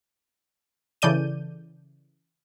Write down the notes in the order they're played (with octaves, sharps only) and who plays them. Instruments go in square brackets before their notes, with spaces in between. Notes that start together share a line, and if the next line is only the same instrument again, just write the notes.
[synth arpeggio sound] C#3 E3 A4 D5 G6 D#7